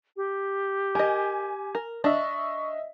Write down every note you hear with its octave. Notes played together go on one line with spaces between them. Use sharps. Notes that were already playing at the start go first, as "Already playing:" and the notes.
G4
A#4 D#5 G#5
A#4
D4 D#5 E5 C#6